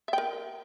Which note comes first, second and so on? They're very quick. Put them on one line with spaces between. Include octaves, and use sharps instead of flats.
E5 G5 A#4